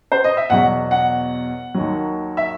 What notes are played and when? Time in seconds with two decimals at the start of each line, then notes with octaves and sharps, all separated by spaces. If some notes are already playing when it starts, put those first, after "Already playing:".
0.12 C5
0.24 D#5
0.37 E5
0.50 E2 B2 F#3 F#5
0.91 F#5
1.74 D#2 D#3 F#3
2.37 E5